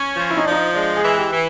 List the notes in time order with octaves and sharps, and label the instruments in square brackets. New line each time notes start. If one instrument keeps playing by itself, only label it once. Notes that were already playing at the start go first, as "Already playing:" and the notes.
Already playing: [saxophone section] C#4
F3
[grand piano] E4
D#4
[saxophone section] F3 [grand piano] D4
[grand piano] D#4
[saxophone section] G#3 [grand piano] D4
[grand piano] G#4
[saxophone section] E3
[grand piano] G4
[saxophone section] E3